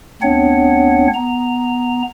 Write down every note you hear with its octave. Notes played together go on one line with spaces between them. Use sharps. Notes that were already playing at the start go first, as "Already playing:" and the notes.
D2 B3 C4 D4 C#5 F#5
B3 A#5